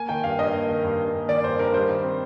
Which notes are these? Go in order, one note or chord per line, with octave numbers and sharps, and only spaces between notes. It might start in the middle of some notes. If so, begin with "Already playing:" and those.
Already playing: A#3 G#5
D#3 G5
G2 F5
G2 D#5
A#3
D#3
G2
G2
A#3
D#3 D5
G2 C5
G2 A#4
G3 C5
D#3
C4